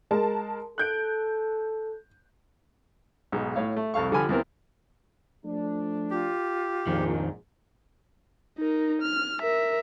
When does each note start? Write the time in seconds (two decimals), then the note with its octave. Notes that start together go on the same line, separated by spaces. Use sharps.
0.11 G#3 A#4 A5
0.78 A4 F#6 G6 D7
3.32 B1 G#2
3.56 A2 C#5 F5
3.76 A3
3.94 C2 F2 A4 F5 C#6
4.12 D3 F3 G4 G#5 B5 F6
4.29 E2 E3 C4 A#4
5.44 F3 A3 D4
6.10 F4 G4
6.87 A#1 F2 G#2 D#3
8.59 D#4 A#4
9.02 F6
9.42 A#4 E5